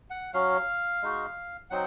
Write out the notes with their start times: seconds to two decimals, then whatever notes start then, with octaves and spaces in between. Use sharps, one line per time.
0.10 F#5
0.33 F#3 C#4 F#4 F5
1.02 G#3 D#4 F#4
1.70 F#3 C4 D#4 F#5